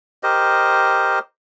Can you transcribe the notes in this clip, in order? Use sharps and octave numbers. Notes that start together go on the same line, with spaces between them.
G4 A#4 C5 D#5